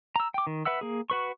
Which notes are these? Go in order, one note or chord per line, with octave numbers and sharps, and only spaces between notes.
A#5 E6
G5 D6
D#3
B4 E5 F#5 E6
A#3 G#4
F#4 B4 C#6